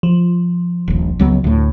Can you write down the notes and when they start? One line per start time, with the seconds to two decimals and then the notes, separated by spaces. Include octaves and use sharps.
0.03 F3
0.88 D#1 A#1
1.19 C#2 F#3 B3
1.44 D2 A2